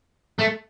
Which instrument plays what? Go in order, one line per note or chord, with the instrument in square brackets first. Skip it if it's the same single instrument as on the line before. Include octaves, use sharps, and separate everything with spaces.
[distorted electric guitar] A3